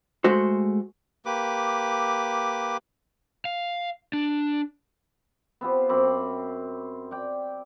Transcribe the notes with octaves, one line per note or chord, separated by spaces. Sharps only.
G#3 A3 F#4 C5
A#3 G4 B4 D6
F5
D4
B3 C4 F4 G4
F#2 C4 B5 D6
D5 G5